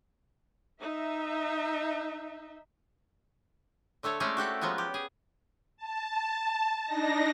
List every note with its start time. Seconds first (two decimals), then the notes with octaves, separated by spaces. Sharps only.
0.80 D#4 E5
4.03 D3 A3 A4 C#5
4.20 G#3 A3 C#4 E4 C5 D5
4.37 F#4 G4 A4 F#5
4.61 F3 F#3 G#3 B3
4.78 G4
4.94 G#4
5.77 A5
6.85 D4 D#4 A#6